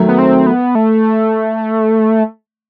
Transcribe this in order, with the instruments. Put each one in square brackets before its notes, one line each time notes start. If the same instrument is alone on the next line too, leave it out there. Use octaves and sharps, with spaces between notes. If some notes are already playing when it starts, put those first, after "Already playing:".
Already playing: [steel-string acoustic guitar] D#3 F#3 A3
[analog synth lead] B3
C4
B3
A3